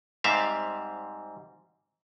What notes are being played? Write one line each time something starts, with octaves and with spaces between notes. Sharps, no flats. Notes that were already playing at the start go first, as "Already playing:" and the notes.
G#2 G3 C4 E5 F5